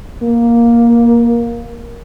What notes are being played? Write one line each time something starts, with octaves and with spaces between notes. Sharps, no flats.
A#3